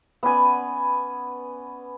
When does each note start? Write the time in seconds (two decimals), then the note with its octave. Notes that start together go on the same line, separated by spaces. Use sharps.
0.23 B3 C#4 D5 G#5